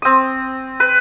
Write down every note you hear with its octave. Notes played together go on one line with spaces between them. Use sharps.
C4 D#6
B4